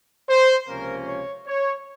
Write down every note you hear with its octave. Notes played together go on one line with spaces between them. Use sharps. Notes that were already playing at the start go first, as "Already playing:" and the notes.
C5
C#2 C3 F3 A#3 C#4 A#4
C#5
C#5